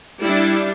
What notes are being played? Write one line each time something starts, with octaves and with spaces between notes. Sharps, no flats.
G3 D4 E4